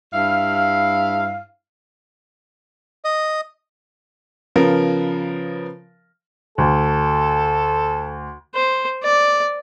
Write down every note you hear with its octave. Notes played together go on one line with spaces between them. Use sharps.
G2 E4 F5
D#5
C#3 F3 B3 A#4
D2 A4
C5
D5